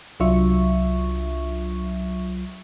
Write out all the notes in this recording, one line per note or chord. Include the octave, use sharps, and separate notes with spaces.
C2 F#3 D4 F4 E5 C#6